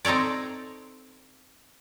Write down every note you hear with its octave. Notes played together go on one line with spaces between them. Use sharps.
C4 D#4 A4 C#5 D5